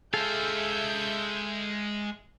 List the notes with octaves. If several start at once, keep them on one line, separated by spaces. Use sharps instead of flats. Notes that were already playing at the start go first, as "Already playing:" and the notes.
G#3 G#4 A4 E5 F5 A5 G6